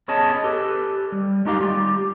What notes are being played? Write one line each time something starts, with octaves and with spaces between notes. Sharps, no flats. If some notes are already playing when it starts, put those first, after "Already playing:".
B3 C#4 G#4 C#5 D#5 A5
G4 A4 B4
G3
G#3 D#4 G4 F5
G3 F4 G4